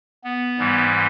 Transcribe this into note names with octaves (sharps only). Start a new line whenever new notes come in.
B3
G#2 E3 G3